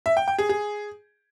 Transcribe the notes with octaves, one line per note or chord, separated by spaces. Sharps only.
E5
G5
G5
G#4
G#4